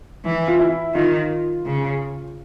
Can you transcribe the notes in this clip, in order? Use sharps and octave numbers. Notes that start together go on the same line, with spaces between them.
E3
F4
E4
D#3 F4
C#3